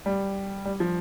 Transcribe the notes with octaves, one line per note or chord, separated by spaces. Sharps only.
G3
G3
F3